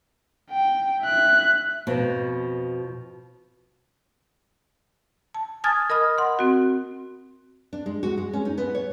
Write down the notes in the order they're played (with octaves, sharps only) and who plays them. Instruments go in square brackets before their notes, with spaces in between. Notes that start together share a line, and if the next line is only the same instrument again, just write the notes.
[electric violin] G5
E5 F#6
[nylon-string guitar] F2 B2 F3
[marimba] A5
G#5 A5 D#6 F6 G#6 A6
A#4 D#5 B5 D#6 F6
F#5 C6
C4 F#4
[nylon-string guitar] D4
G#3
F#4
G#3
C#4
D#4
B3
C#5